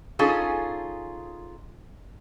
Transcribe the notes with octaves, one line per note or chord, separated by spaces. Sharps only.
C#4 D#4 F4 G#4 A4